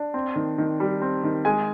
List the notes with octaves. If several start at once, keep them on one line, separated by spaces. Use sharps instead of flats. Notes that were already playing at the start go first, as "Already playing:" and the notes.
Already playing: D4
C4
D#3
D#3
G3
C4
D#3
G#3 G#5